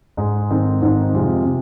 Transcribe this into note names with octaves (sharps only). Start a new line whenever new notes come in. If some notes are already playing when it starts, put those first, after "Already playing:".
G#2 G#3 D#4
G#2 D#3 C4 D#4
G#2 D#3 C4 D#4
F2 C3 G#3 F4
C3